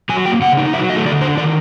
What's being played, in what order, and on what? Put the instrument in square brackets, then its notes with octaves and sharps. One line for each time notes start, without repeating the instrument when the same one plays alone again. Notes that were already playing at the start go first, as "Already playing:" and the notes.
[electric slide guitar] F#3 G#5
A#3 G5
C#3 F#5
D#4
F#3 E5
A3 D#5
D3 D5
D4 C5
D#3 D5